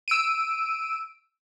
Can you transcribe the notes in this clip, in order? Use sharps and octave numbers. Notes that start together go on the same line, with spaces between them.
E6 D7 D#7